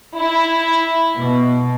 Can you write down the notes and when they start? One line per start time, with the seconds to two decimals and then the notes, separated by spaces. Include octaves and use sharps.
0.18 E4
1.17 B2